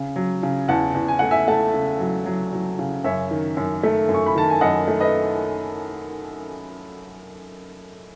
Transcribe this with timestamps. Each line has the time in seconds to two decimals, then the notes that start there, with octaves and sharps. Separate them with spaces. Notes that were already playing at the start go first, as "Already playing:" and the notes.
Already playing: C#3
0.16 F#3
0.43 C#3
0.68 E2 F#5 A5
0.94 E2
1.08 G#5
1.19 A3 F#5
1.31 E5 G#5
1.48 A3 F#5 A5
1.74 C#3
2.00 F#3
2.26 F#3
2.53 F#3
2.79 C#3
3.04 F#2 C#5 E5
3.31 D#3
3.57 F#2
3.83 A3
4.09 F#2
4.14 C#6
4.26 B5
4.35 D#3 A5
4.50 G#5
4.61 F#2 D#5 F#5
4.87 A3
5.00 B4 D#5